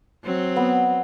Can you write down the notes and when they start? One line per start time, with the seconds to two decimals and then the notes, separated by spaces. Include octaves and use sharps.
0.24 F#3 C4
0.56 B3